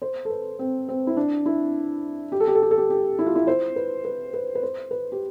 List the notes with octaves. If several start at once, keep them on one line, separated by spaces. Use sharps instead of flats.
C5
A4
B4
C4
C4
E4
D4
E4
G4
A4
G4
A4
G4
A4
G4
G4
E4
F4
E4
C5
B4
B4
B4
B4
C5
B4
G4